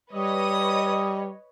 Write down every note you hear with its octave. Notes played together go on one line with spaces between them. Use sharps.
G3 B4 C#5 D#5 D#6